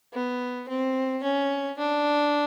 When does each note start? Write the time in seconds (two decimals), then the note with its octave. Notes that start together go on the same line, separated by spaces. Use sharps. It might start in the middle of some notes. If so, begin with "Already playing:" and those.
0.13 B3
0.68 C4
1.23 C#4
1.78 D4